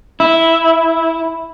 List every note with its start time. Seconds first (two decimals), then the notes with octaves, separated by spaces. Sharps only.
0.20 E4